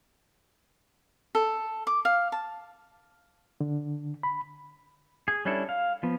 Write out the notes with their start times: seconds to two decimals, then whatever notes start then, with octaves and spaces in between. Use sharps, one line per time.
1.35 A4
1.87 D6
2.05 F5
2.32 A5
3.61 D3
4.23 B5
5.28 G#4
5.45 G3 C#4 D4 E4 A4
5.69 F5
6.03 F3 B3